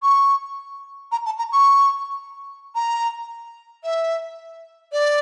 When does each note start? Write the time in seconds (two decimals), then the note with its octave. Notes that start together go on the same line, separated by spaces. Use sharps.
0.02 C#6
1.12 A#5
1.26 A5
1.38 A#5
1.52 C#6
2.75 A#5
3.84 E5
4.92 D5